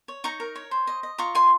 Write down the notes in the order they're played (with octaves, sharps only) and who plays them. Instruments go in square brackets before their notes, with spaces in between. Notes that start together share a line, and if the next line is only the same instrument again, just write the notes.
[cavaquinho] C#5
D#4 A#5 C#6
A#4
C#5
C5
D#5
D#5
F4 A#5 C#6
D#5 G#5 C6